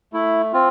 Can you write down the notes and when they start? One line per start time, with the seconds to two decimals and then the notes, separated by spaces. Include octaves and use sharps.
0.13 A3 E4
0.53 C4 F4